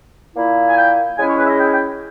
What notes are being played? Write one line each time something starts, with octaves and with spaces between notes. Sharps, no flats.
A#2 A#3 E4
G#5
G5
C#3 G#3 C#4 E4 G#5
C#5
B4
E5
D#5
G5
G5